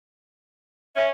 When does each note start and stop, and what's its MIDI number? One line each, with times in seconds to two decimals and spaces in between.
0.96 1.09 61
0.96 1.06 76